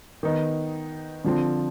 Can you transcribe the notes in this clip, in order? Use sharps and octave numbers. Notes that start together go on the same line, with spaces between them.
D#3 B3 D#4
D3 F3 C4